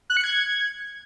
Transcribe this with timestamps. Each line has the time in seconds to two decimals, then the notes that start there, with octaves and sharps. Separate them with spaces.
0.10 F#6
0.17 C#7
0.24 G#6